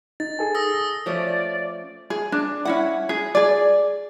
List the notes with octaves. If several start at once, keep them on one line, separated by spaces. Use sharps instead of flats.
D#4 A6
G#4 A4 G#5
D#6 E6 A#6
F3 A3 C#4 D5
G#4
D4
C#4 E4 F#5
G#4
G#4 D5